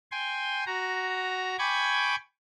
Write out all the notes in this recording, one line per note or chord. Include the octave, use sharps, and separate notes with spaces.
G5 G#5 C6
F#4 A#5
G5 G#5 B5 C#6 D6 G#6